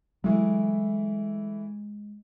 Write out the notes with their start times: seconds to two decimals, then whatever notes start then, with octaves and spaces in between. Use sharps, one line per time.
0.24 E3 F#3 G#3 A3 E4